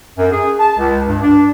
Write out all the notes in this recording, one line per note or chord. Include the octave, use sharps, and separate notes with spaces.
F#2
G#4
A5
C#2
G2
D4